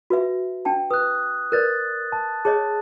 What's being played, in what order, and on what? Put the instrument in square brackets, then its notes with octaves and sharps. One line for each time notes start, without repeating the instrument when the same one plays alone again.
[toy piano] F#4 B4 E5
D4 G5 A5
[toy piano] B4 [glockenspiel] D#6 F#6
[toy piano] A#4 B4 D5 [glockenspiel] F#6 A6
[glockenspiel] A5
[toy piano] G#4 C#5 D#5 [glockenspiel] A5